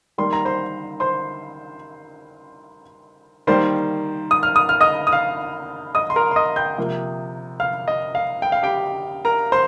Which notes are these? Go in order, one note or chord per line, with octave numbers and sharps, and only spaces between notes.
D#3 G3 A#3 C6
A#5
C5 C6
C5 C6
D#3 G3 A#3 C5 C6
D#6
F6
D#6
F6
D#5 D#6
D#6
F5 F6
D#5 D#6
C6
A#4 A#5
C6
D#5 D#6
G5 G6
C3 F3 A#3
F5 F6
D#5
F5
G5
F5
G4 G5
A#4 A#5
C5 C6